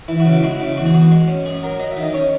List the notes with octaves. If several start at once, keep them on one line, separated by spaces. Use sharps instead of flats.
E3 E4
F#4
C#3
E4
G#3 F#4
C#3 E4
E2 F#4
G#4
E2 F#4
G#3
C#4
F#2 G#4
F#3 A#4
F#3 D#5
E5
D#3
D#5
C#4 C#5